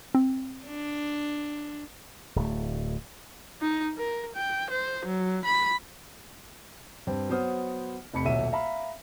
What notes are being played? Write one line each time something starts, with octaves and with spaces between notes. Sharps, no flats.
C4
D4
D1 A3
D#4
A#4
G5
C5
F#3
B5
G2 C4
F#3 B3 C5 D#6 F6
F1 F2 B5 C#7
D#1 B1 E5 D#7
E5 F5 A#5 B5